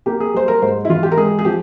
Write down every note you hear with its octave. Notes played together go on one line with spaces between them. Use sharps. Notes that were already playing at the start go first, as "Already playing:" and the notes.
A#3 G4
G#4
G3 C5
A#4
G#2 C5
E4
E3 F4
G4
A#4
G#3 G#4
G#4
F3 G4